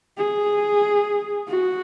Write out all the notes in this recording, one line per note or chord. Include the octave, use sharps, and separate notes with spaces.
G#4
F#4